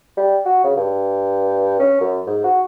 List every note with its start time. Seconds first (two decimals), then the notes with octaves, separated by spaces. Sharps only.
0.17 G3
0.45 F#4
0.64 C#3
0.77 G2
1.79 C#4
2.01 F#2
2.26 G#2
2.44 F#4